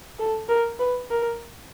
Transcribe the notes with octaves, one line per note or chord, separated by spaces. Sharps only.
A4
A#4
B4
A#4